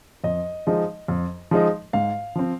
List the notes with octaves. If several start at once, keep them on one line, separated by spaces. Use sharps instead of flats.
F2 D#5
F3 G#3 D#4
F2
F3 G#3 D#4
G#2 F5
F3 C4